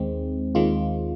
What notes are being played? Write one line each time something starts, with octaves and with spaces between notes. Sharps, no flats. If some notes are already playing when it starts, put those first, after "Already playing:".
Already playing: D#2 D#3 G#3 C4
D#2 D#3 G#3 C4 F4